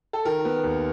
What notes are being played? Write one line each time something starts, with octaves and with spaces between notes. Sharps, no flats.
A4
D#3 A#4
B3
D#2